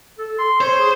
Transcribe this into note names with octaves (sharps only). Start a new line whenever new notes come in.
A4
C6
C5 C#5
G#4